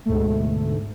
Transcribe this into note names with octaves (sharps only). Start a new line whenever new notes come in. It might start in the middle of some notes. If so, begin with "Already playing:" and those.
D2 G#2 B2 A3